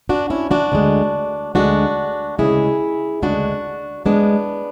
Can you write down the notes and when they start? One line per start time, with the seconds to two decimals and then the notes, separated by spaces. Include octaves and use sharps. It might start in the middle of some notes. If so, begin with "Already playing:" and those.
0.09 D4 F#4
0.30 C#4 E4
0.51 D4 F#4
0.72 D2 D3 G#3
1.55 D2 D3 G#3 D4 F#4
2.39 D2 C#3 G#3 E4 G#4
3.22 D2 C#3 G#3 D4 F#4
4.06 A2 G#3 B3 D4